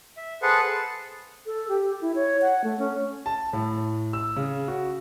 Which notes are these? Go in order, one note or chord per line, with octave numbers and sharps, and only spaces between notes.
E5
G#4 A4 B4 C5 F#5
A5
A4
G4
E4
C#5
F#5
A3
C#4
A5
A2
E6
C#3
F#4